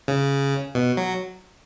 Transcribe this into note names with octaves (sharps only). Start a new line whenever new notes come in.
C#3
B2
F#3